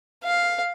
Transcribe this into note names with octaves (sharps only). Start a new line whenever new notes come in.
F5